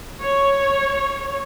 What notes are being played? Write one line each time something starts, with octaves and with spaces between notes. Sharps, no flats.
C#5